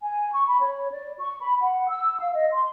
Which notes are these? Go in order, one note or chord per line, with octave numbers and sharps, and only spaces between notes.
G#5
C#6
B5
C#5
D5
C#6
B5
F#5
E6
F5
D#5
C6